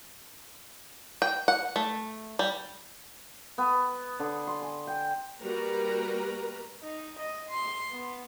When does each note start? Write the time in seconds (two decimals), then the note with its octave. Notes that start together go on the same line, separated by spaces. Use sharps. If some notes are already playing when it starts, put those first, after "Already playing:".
1.22 G5
1.48 F#5
1.76 A3
2.39 G3
3.58 B3
4.20 D3
4.47 C6
4.62 G#5
4.87 G5
5.40 G3 A#3 F#4 A#4 B4 A#5
6.83 D#4
7.20 D#5
7.50 C6
7.92 B3